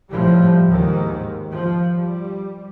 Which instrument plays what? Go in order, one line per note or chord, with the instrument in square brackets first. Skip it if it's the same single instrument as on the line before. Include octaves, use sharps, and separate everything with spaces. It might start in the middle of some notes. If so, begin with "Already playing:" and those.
[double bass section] A2 F3 G3
D#2 G#2 D#3
F3
G3